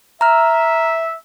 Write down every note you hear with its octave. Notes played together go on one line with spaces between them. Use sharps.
E5 A#5 F6